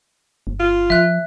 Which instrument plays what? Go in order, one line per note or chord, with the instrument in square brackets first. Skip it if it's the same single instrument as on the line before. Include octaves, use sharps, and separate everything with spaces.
[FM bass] G1
[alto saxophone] F4
[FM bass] F3 [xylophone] E5 F#6